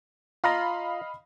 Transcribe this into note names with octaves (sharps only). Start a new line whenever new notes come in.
F4 D#5 F5 A#5 B5